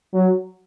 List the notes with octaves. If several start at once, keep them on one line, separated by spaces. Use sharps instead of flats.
F#3